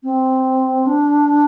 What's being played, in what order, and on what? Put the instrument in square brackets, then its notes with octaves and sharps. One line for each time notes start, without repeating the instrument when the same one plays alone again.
[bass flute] C4
D4